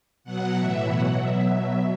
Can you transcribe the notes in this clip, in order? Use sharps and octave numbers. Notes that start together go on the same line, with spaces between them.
B2 F#3 F#5
A2 E3 E5
B2 F#3 F#5
B2 F#3 E5
B2 F#3 E5